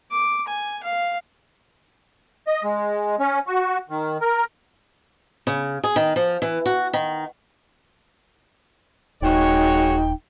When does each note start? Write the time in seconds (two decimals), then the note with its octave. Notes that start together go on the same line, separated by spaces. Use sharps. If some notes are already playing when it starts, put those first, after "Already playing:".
0.11 D6
0.48 G#5
0.83 F5
2.47 D#5
2.64 G#3
3.20 C#4
3.47 F#4
3.90 D#3
4.21 A#4
5.47 C#3
5.84 G#4
5.96 D#3
6.16 F3
6.42 E3
6.66 F#4
6.93 D#3
9.22 D#1 G#3 D#4 F#4 C#5 G5